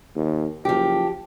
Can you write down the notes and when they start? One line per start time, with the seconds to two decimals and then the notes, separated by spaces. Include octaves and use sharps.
0.15 D#2
0.65 F#1 F3 G4